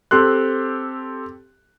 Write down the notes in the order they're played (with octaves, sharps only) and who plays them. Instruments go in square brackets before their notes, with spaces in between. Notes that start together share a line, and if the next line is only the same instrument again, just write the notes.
[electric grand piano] C4 G4 A4 C6 F#6